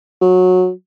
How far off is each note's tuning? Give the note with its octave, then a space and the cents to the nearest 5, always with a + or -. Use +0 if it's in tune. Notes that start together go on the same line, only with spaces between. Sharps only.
F#3 -15